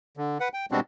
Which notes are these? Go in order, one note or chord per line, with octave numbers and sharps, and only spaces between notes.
D3
B4 F#5
G5
B2 G3 G#3 C4 D4 F#4